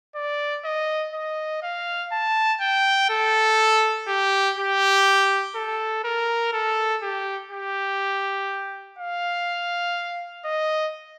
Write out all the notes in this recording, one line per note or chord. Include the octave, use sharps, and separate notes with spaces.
D5
D#5
D#5
F5
A5
G5
A4
G4
G4
A4
A#4
A4
G4
G4
F5
D#5